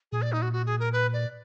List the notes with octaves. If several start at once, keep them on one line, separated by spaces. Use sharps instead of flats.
A#2 G#4
D5
D#4
F#4
F#4
G#4
A#4
B4
D5